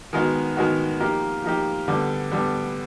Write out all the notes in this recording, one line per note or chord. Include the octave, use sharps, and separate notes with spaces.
D#3 G#3 B3 D#4 F#4
D#3 G#3 B3 D#4 F#4
F3 A#3 D#4 G4
F3 A#3 D#4 G4
D3 G3 B3
D3 G3 B3